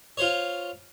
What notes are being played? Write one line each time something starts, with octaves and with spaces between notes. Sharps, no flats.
F4 C5 C#5